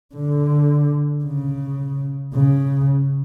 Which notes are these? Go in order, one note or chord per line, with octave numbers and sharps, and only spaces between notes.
D3
C#3
C#3